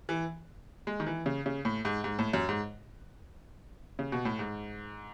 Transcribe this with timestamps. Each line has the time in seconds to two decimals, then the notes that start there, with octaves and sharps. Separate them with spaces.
0.09 E3
0.87 G#3
1.00 D#3
1.07 E3
1.26 C#3
1.46 C#3
1.65 A2
1.85 G#2
2.04 G#2
2.19 A2
2.33 F#2
2.49 G#2
3.99 C#3
4.12 B2
4.25 A2
4.39 G#2